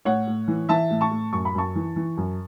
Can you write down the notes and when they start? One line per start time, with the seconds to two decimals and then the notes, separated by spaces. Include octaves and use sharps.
0.05 A2 C#5 F#5
0.27 A2
0.48 E3
0.69 E3 E5 A5
0.90 A2
1.01 A5 C#6
1.11 A2
1.33 F#2 C#6
1.45 B5
1.55 F#2 A5 C#6
1.75 E3
1.96 E3
2.17 F#2